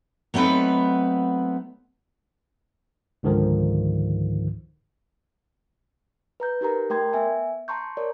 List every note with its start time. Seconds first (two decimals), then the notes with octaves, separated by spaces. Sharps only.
0.34 F#3 A3 B3 C4 D#4 B4
3.23 C#2 G#2 D3 D#3 F3
6.40 B4 A#5 G6
6.61 D#4 G4 A#4 A#5
6.90 A3 A#4 G5 C6 G#6
7.13 B3 E5 G#5
7.68 A5 A#5 C6 C#6 G6
7.97 A#4 C#5 D5